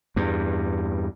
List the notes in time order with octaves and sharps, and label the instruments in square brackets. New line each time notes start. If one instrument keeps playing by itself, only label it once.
[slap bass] E2 G2